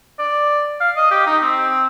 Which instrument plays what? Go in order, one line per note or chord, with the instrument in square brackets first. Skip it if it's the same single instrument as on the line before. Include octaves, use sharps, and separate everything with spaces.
[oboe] D5
F5
D#5
G4
D#4
C4